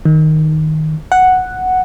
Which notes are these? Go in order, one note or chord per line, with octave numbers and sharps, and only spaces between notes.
D#3
F#5